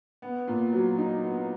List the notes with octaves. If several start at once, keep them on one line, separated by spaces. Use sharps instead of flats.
B3
A#2
F#3
D#4
B3